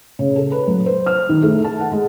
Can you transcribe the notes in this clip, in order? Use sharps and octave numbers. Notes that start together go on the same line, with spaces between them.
C#3
A4
B4
F#3
C5
F6
D#3
A3
A5
F#5
G#3